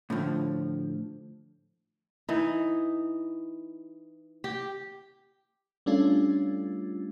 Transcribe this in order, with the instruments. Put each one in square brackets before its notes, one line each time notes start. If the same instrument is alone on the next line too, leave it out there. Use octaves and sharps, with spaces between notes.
[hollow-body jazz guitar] A2 D3 F3
[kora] E3 D#4
G4
[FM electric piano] G3 A3 C#4 D4 F4